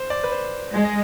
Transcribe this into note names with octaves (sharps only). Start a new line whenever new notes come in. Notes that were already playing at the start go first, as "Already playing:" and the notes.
Already playing: C5
D5
B4
C5
G#3
D#5